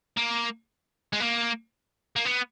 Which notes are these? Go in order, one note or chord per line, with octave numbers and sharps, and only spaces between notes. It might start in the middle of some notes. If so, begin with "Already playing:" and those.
A#3
G#3
A#3
A#3
B3